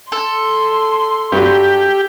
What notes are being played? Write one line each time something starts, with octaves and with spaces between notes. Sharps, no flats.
A4 C6
G2 F#3 G4